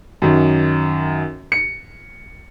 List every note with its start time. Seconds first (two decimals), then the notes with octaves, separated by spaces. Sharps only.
0.22 F#2 D#3
1.52 C#7